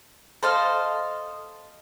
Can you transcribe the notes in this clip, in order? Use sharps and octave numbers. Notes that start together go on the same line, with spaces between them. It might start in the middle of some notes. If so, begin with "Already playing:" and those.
A4 C5 D#5 F5